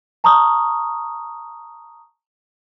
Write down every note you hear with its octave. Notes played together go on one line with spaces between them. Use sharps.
A5 A#5 C#6 D#6 F6